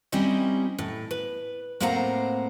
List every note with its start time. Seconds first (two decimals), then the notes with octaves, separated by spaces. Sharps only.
0.12 G3 C4 C#4 D#4 E4 D#5
0.79 A2
1.11 B4
1.80 A2 A#3 C4 C5 F#5 A#5